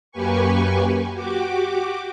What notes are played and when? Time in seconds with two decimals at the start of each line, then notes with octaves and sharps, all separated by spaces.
0.11 F#2 A#3 G4 B4 G#5 C#6
1.12 F#4 G4 D6